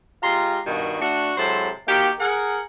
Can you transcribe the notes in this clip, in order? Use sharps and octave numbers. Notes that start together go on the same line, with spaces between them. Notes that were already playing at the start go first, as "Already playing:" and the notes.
G#3 F4 G4 A#5 C6
G2 B2 D#3
A3 D4 F#4
C3 F#3 G#3 E4 A4 C5
D#3 A#3 D#4 F#4 G4
G#4 A#4 F#5